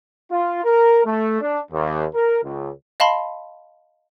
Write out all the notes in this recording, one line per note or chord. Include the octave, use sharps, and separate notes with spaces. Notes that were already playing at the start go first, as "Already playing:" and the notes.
F4
A#4
A3
D4
D#2
A#4
C#2
D#5 F5 A5 B5 C6